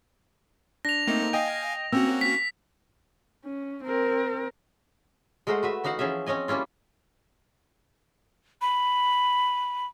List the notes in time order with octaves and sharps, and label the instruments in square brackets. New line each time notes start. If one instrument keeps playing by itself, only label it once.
[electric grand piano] D4 [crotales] A#6 F7
[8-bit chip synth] A3 C4 [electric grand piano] A#3 D#4
[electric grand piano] D#5 G5 [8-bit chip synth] F5 G#5
[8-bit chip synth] A#3 C#4 F#4 [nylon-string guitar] C4 [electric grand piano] E6
[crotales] B6
[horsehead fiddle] C#4
C4 A#4
[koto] G#3 A3 A#4 C5 F#5
F#4 B4 E5
E3 D#4 F#4 F5 F#5
E3 F3 C#4 G#4 E5
C4 C#4 C#5 D#5 G#5
G3 A#3 C#4 E4 F4
[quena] B5